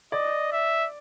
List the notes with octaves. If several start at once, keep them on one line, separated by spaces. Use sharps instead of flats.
D5 D#5
E5